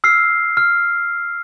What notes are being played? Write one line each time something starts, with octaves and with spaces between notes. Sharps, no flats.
E6 F6 C7
F6